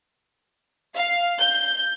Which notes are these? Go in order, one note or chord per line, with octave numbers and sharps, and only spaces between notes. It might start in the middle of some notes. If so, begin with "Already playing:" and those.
F5
G6